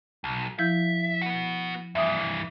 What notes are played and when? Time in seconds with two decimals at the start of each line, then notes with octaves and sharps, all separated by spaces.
0.24 B1
0.59 F3 E4 E5 G6
1.22 B3 F#4
1.95 G2 E3 E5 D#6